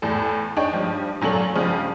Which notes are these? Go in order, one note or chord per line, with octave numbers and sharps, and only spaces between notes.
E2 A2 A4
D4 D#4 G#4 C#5 G5
G2 F3
A#2 F#3 C#4 A4 F#7
C#2 G2 C#3 F3 G#3